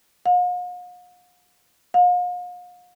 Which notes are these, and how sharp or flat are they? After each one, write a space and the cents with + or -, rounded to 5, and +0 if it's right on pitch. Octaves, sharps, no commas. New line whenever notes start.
F5 +45
F5 +40